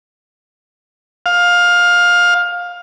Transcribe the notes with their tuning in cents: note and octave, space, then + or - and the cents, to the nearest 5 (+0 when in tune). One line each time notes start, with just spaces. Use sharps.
F5 +15